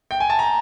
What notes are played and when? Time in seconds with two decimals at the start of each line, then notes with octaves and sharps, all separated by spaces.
0.11 G5
0.20 G#5
0.30 A5
0.39 A#5